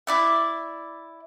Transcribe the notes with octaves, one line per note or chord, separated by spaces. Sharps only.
E4 D5 E5